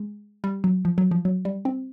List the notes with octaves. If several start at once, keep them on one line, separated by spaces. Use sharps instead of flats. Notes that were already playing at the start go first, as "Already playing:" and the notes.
Already playing: G#3
G3
F#3
F3
F#3
F3
F#3
G3
C4